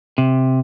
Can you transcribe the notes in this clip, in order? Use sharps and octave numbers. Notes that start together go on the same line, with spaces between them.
C3